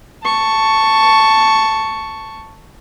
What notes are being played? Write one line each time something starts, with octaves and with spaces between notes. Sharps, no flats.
A5 C#6